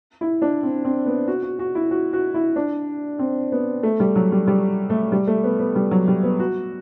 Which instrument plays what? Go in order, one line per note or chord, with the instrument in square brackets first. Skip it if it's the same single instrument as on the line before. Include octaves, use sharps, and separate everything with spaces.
[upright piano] E4
D4
C4
C4
B3
F#4
F#4
F#4
E4
F#4
F#4
E4
D4
C4
B3
A3
G3
F#3
G3
G3
A3
G3
A3
B3
B3
G3
F#3
G3
B3
F#4